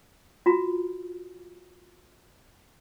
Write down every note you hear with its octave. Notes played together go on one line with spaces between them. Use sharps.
F4 F#4 A#5